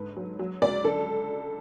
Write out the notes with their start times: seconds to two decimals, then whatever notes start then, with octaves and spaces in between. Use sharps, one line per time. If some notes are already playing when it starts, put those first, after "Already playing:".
Already playing: G#2 D3 B4
0.16 F#3
0.39 F#3
0.62 C#2 D5
0.84 D3 A4